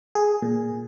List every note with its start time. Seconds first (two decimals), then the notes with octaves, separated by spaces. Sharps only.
0.15 G#4
0.42 A#2